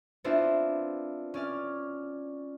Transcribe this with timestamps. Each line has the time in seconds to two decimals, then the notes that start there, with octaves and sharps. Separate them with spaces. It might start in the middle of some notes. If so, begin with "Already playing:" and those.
0.24 B3 C4 D4 E4 F4
1.34 C#4 D5 F6